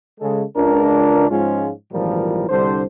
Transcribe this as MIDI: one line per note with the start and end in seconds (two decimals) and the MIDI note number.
0.20 0.43 49
0.20 0.43 56
0.20 0.43 69
0.56 1.28 37
0.56 1.28 62
0.56 1.28 70
1.30 1.70 44
1.30 1.70 53
1.30 1.70 56
1.30 1.70 61
1.30 1.70 65
1.92 2.47 32
1.92 2.47 46
1.92 2.47 52
1.92 2.47 53
1.92 2.47 55
1.92 2.47 70
2.49 2.84 36
2.49 2.84 50
2.49 2.84 55
2.49 2.84 62
2.49 2.84 72